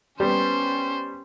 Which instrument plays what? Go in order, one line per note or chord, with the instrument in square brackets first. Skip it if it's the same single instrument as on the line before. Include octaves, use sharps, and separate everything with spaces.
[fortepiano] G3 B3 [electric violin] C#4 C5